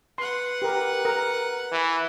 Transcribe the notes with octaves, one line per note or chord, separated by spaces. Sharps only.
B4 F#5 C6
G4 A#4
A#4
E3